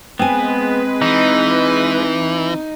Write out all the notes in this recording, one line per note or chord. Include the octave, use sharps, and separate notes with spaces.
G#3 B3 C4 B4 G#5
E3 D#4